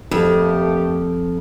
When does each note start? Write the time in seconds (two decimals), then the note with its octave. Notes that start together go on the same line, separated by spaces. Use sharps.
0.11 F2 A3 A#3 G4